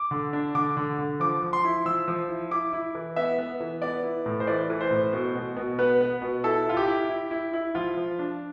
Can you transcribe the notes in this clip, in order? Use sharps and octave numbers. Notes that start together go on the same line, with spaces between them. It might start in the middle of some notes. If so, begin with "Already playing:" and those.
Already playing: D6
D3
D4
D3 D6
D3
D3
F3 D6
F3
C6
E4
F3 E6
F3
E4
E4 D6
E4
E3
B3 E5
B3
E3
B3 D5
E4
A2
C5
E3 D5
E3
C5
A2
B2
B2
B2
B3 B4
B3
B2
E4 A4
E4 F4
G4
E4
E4
E4
E4
F3 F4
F3
D4